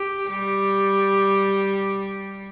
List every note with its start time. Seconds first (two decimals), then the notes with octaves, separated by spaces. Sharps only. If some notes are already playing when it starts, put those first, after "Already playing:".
Already playing: G4
0.28 G3 G4